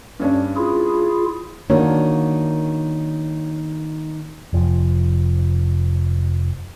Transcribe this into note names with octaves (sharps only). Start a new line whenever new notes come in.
G2 C#4 D4
E4 F4 G#4
D#3 A#3 D4 F#4 C#5
F1 F3